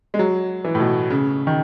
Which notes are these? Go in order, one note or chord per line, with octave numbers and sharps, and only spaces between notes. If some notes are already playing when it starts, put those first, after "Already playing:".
G#3
F#3
E3
A2
B2
C#3
D#3